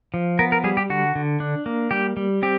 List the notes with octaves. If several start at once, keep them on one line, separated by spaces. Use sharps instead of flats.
F3
B3 A#4
A#4
G3 G#4
G4
D3 F#4
D3
D4
A#3
G3 G4
G3
C4 G4